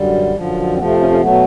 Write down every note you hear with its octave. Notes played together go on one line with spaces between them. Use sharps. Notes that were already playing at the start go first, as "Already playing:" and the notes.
Already playing: F#2 D3 G3
F#2 D3 F3
C4
F2 C3 F3 A3 B3
C4
C#4
C#4
B2 F#3 A3 B3